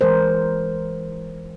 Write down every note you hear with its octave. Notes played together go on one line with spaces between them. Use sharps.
E3 G#3 A#4 C5